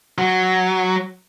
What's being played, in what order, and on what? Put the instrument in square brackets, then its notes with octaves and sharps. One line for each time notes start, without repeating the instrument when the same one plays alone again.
[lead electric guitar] F#3